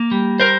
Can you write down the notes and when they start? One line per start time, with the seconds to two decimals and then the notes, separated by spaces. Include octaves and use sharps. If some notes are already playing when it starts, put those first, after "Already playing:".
Already playing: A#3
0.11 G3
0.40 A#4 C5